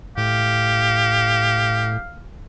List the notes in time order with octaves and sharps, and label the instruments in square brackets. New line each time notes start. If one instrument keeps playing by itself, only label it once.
[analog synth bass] A2 [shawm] G4 [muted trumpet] F5